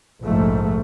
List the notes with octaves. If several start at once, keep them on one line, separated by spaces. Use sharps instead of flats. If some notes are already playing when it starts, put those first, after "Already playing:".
F1 A#1 G#2 F3 A3